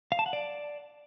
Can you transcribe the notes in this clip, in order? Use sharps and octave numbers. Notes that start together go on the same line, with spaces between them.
F5
A5
F#5
D5